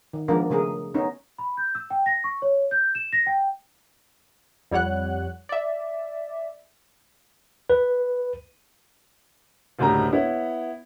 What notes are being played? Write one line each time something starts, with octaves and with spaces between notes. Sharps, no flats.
D#3
F3 G#3 A#3 B3 D4 A#4
C#3 A3 G#4 A#4
B3 C#4 D#4
B5
G6
E6
G5
A#6
C#6
C#5
G6
E7
A#6
G5
F2 G3 C#5 F#5 F#6
D5 E5
B4
F#1 D2 A2 G3 A3 A#5
B3 E4 C#5